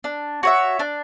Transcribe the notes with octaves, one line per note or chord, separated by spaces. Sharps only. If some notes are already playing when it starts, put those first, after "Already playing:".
D4
F#4 C#5 E5
D4